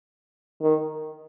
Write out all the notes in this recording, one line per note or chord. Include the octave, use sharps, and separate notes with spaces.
D#3